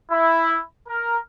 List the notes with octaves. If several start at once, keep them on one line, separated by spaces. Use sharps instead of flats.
E4
A#4